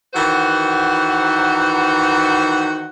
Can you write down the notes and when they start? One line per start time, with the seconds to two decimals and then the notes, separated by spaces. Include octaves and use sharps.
0.13 D#3 E3 F#4 C5 F#5